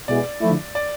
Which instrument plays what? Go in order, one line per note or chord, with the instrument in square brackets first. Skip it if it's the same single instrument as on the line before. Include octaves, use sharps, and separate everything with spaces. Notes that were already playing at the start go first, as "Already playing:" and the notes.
[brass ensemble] B2 G#3 B3 E4 G#4 [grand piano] D5
[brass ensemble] D3 F3 A3 E4
[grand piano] D5